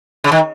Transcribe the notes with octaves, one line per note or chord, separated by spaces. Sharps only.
C#3
D#3